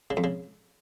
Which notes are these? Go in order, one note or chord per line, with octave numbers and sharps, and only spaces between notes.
C#3
F2
C#3